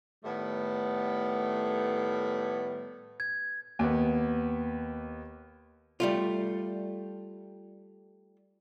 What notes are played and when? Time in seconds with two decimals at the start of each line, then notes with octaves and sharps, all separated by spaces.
0.24 A2 D#3 G3 A3 B3
3.20 G#6
3.79 D#2 B3
6.00 G3 A3 F4